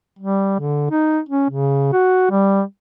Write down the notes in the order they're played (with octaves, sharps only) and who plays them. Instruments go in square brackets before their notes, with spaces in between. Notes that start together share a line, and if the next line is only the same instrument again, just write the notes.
[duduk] G3
D3
D#4
C#4
C#3
F#4
G3